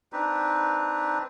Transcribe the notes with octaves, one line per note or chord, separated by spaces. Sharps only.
C4 D4 D#4 B4